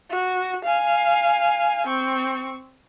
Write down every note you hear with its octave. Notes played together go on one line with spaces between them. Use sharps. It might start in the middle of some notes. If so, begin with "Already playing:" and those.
F#4
F5 G#5
C4 C#6